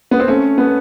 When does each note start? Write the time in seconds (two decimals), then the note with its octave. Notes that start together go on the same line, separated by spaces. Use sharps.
0.11 B3
0.20 C4
0.28 A3 C#4
0.58 B3